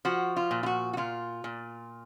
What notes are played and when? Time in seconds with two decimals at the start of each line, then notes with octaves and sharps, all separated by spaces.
0.05 F3 F#4
0.36 F4
0.51 A#2
0.63 F4
0.66 F#4
0.93 F#4
0.97 A#2 F4
1.44 A#2